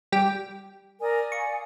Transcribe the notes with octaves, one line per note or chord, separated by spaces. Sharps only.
G3 G4 G5
A#4 D5 G#5 D#6
F5 C#6